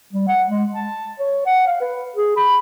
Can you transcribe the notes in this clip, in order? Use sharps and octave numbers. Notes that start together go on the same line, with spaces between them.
G3
F#5
G#3
A5
C#5
F#5
F5
B4
G#4
B5